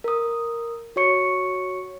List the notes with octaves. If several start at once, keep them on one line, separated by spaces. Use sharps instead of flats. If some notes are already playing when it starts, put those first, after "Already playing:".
A#4 D#6
F#4 C#5 C#6 C#7